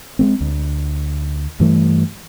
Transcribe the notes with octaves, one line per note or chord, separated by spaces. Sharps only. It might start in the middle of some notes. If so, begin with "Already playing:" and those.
G#3 A3 C4
D2
G2 E3 A3